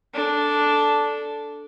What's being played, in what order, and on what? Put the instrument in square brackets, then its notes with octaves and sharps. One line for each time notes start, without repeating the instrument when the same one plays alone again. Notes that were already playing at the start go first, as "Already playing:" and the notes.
[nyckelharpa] D4 A4